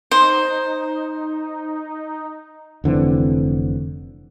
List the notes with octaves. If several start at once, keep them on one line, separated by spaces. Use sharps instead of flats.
D#4 C5
F1 D3 E3 C4